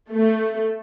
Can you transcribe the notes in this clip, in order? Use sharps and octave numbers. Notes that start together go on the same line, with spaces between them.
A3